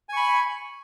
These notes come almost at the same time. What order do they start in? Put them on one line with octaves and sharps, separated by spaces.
G#5 C#6 B5